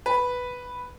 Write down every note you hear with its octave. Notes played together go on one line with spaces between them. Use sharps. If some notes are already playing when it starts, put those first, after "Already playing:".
B4